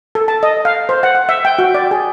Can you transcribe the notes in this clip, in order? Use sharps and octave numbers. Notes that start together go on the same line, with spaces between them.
A4
A5
D#5
F5
C5
F#5
F#5
E5
G5
F#4
D5
G#4